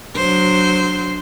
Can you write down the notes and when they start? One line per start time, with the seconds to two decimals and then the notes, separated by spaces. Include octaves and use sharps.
0.15 F#3 D4 C5